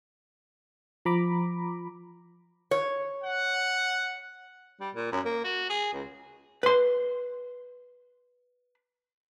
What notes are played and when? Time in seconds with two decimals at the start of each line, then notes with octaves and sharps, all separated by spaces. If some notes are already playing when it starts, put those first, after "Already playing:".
1.05 F3 A#5 B5 D6
2.71 C#5
3.24 F#5
4.81 G3
4.95 A#2
5.12 F#2
5.25 A#3
5.44 F#4
5.70 G#4
5.93 C#2
6.63 B4 C6